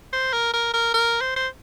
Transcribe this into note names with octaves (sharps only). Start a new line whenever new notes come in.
C5
A#4
A#4
A#4
A#4
C5
C5